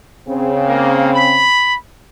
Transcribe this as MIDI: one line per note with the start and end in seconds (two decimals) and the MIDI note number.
0.28 1.45 49
0.28 1.45 60
0.66 1.09 58
1.12 1.74 83